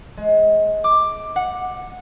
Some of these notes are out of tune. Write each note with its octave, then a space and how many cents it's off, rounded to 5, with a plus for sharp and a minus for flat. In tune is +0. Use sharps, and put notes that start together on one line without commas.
G#3 +25
D6 +10
F#5 -15